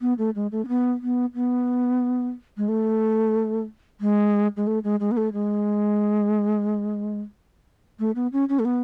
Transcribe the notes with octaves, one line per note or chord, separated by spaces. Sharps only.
B3
A3
G#3
A3
C#4
B3
B3
B3
G#3
A3
G#3
G#3
A3
G#3
G#3
B3
A3
G#3
A3
B3
C#4
C#4
A3
B3